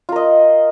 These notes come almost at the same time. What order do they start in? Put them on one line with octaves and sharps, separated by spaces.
F4 A#4 D#5